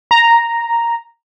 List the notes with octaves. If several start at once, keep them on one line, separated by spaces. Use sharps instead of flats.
A#5